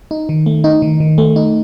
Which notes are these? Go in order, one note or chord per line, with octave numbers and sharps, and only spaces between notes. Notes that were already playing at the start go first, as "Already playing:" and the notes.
D#4
D#3
A3
D#4
D#3
D#3
A3
D#4